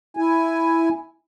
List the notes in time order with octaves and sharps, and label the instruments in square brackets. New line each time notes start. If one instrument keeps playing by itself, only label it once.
[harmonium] E4 G#5